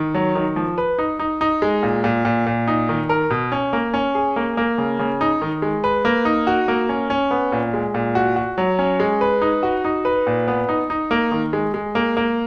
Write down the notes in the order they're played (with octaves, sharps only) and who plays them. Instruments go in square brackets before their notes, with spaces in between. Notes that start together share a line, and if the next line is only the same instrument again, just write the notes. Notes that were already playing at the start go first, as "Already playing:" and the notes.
Already playing: [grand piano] D#3
F#3
D#3
F3
B4
D#4
D#4
D#4
G#3
A#2
A#2
A#2
A#2
D#4
D#3
A#4
B2
C#4
A#3
C#4
G#4
A#3
A#3
C#3
C#3
D#4
D#3
G#3
B4
A#3
D#4
F#4
A#3
C#4
C#4
B3
A#2
G#3
A#2
F#4
F#4
F#3
C#4
G#3
B4
D#4
F#4
D#4
B4
A#2
B3
D#4
D#4
A#3
D#3
G#3
G#3
A#3
A#3